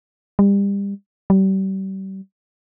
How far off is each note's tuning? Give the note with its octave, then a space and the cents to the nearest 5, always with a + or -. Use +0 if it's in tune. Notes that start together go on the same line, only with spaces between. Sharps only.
G3 +30
G3 -35